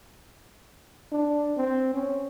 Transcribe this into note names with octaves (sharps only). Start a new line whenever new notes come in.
D4
C4
C#4